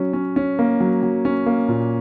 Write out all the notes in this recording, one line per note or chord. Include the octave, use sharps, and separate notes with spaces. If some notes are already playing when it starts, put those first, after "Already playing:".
Already playing: F#3 C#4
C#4
C#4
A#3
F#3
F#3
C#4
A#3
A#2